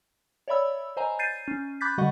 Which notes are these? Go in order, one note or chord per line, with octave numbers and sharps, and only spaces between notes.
C#5 D5 E5 B5 E6
C5 D#5 G#5 A#5
G6 A6 C7 D#7
C#4
B5 D6 F#6 G6 A6 B6
D3 G3 F#4 D#5 F#5 C#6